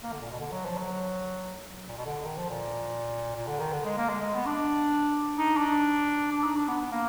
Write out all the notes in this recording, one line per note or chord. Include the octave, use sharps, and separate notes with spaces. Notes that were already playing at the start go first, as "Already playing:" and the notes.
A#3
D3
A#2
B2
D3
F#3
F3
F#3
A#2
B2
D3
D#3
F3
A#2
A#2
D3
D#3
D3
G#3
A#3
G#3
G#3
B3
D4
D#4
D4
D4
D#4
D4
B3
B3
A#3